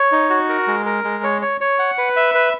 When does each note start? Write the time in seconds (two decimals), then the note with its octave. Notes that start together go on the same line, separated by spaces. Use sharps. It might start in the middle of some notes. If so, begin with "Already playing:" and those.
Already playing: C#5
0.12 D#4
0.30 F#4
0.49 A#4
0.67 G#3
0.86 A#4
1.04 G#3
1.24 C#5
1.42 C#5
1.61 C#5
1.79 F#5
1.98 B4
2.16 E5
2.35 B4